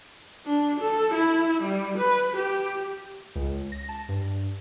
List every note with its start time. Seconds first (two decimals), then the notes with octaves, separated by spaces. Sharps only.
0.46 D4
0.81 A4
1.14 E4
1.63 G3
1.98 B4
2.37 G4
3.35 C#2
3.72 A#6
3.89 A5
4.09 G2